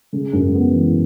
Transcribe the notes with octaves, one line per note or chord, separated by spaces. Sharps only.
C#3
F#2
B3
E3